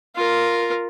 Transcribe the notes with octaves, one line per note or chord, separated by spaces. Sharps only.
F4 A#4